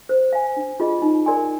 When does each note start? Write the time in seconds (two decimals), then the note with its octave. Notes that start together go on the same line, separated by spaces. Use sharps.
0.09 C5
0.33 F5 G#5
0.57 D4
0.80 F4 G#4 D#5
1.02 D#4
1.26 A#4 D5 G#5 C6